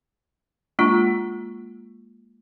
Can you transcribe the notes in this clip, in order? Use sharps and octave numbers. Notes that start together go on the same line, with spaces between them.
G#3 A#3 D4 F4